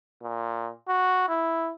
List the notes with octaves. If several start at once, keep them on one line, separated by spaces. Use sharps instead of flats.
A#2
F#4
E4